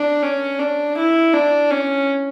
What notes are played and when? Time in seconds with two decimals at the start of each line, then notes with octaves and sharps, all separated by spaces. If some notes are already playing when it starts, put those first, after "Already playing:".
Already playing: D4
0.23 C#4
0.60 D4
0.97 E4
1.33 D4
1.71 C#4